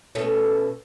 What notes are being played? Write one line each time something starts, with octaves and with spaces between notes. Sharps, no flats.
B2 A3 C#4